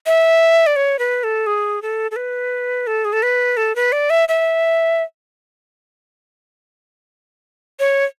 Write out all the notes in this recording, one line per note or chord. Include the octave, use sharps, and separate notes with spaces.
E5
D5
C#5
B4
A4
G#4
A4
A4
B4
A4
G#4
A4
B4
A4
B4
D5
E5
E5
C#5